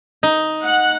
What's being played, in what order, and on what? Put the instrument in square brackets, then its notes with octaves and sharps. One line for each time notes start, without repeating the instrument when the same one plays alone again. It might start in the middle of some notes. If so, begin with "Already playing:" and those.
[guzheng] D#4
[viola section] F#5